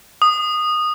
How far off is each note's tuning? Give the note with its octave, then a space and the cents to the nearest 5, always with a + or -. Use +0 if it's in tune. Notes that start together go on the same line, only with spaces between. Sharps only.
D#6 -15